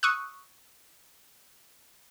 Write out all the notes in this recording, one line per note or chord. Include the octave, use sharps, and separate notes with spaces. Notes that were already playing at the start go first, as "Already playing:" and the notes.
C#6 D#6 E6 F#6